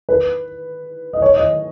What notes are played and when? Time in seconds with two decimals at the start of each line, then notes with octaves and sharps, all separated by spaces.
0.09 B4
1.13 D#5
1.22 C#5
1.36 D#5